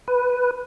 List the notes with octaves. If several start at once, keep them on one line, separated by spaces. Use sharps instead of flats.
B4